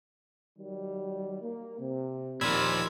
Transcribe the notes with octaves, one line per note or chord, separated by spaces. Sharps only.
D#3 F#3 G3
A#3
C3
D#2 A#2 F3 A#3 B5 E6 G#6